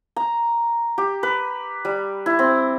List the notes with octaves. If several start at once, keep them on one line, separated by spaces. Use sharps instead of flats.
A#5
G4
B4
G3
E4
C4